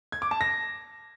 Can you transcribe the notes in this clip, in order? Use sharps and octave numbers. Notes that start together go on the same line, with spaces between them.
G#6
D6
A5
A#6